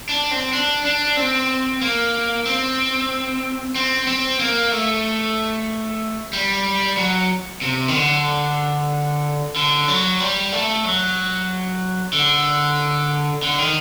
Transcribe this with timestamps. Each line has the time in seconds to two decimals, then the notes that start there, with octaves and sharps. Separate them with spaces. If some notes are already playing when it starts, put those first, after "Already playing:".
0.09 D4
0.31 C4
0.53 D4
0.85 D4
1.17 C4
1.81 A#3
2.46 C4
3.75 C4
4.07 C4
4.39 A#3
4.72 A3
6.33 G3
6.97 F#3
7.61 C3
7.88 D#3
7.94 D3
9.56 D3
9.88 F#3
10.20 G3
10.52 A3
10.84 F#3
12.13 D3
13.42 D3
13.59 D#3